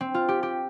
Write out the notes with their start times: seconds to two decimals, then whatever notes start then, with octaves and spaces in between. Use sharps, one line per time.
0.01 C4
0.14 F4
0.29 G4
0.43 G4